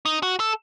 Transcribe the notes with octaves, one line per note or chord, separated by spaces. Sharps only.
D#4
F#4
A4